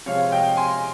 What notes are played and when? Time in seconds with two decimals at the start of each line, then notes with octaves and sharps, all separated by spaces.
0.06 C3 F3 G#3 C#5 F5
0.32 D#5 G5
0.57 G#5 C6